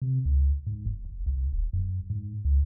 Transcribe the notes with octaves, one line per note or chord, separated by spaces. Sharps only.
C3
C#2
G#2
F#1
F#1
C2
D#1
F#2
G#2
C#2